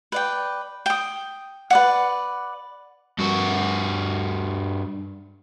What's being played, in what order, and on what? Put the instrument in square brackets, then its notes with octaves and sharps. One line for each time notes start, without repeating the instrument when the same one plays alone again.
[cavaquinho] B4 D5 G5
G5 D#6
B4 D5 F#5
[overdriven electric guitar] G2 F#4